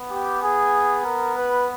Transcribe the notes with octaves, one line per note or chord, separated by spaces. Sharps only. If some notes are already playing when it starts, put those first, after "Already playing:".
Already playing: B3
G4
G#4
A#4
B4